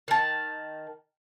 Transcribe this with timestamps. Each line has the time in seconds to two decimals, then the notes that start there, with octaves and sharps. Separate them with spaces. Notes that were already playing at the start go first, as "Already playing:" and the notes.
0.08 D#3 A5